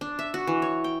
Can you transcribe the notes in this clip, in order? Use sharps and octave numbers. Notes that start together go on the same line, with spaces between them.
D4
E5
F#4
E3
C#5
G5